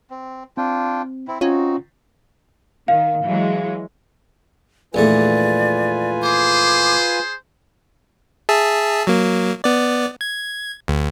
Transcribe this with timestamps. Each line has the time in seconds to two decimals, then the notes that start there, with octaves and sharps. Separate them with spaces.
0.10 C4
0.57 C4 D4 F4 G5
1.28 C4 E4
1.41 C4 C#4 D#4 F4 F#4
2.88 D#3 F5
3.25 E3 F#3 G#3
4.94 A#1 E2 A3 F4 B4 D5 G#5
6.23 G#4 C5 D6
8.49 G#4 E5 A5
9.07 F#3 A#3
9.64 B3 D5
10.21 G#6
10.88 D2